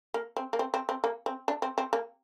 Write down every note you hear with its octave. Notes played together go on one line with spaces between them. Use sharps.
A#3
C4
A#3
C4
C4
C4
A#3
C4
D4
C4
C4
A#3